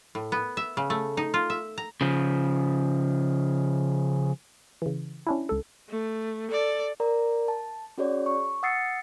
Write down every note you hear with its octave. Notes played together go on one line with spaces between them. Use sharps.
A2
B3
E5
C#3
A3
D#4
F4
E5
A#5
C#3 F3
C#3 E3
C#4 D4 E4
C#2 A4
A3
A4 D5
A#4 D5 A#5
A5
C#4 F#4 G#4 C#5 D5
C#6
F#5 D#6 E6 A6 C7 C#7